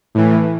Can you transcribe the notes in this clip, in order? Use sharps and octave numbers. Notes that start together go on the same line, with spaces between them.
A2 E3